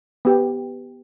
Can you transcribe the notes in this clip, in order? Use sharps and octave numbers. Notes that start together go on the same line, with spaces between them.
B3 G4